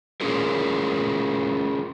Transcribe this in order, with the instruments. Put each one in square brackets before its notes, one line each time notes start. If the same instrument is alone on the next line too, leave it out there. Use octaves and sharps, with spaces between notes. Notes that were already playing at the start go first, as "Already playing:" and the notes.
[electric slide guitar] C#4 F4 G#4 A#4